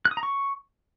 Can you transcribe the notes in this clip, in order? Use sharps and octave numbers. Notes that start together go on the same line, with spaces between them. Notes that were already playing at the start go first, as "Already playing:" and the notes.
F#6
D#6
A#5
C#6